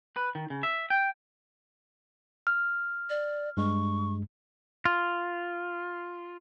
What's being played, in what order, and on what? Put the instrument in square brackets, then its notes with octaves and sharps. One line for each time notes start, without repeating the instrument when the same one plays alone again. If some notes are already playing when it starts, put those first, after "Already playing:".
[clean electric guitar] B4
D#3
C#3
E5
G5
[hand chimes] F6
[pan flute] D5
[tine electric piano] G2 G#3 [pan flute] C#6
[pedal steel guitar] F4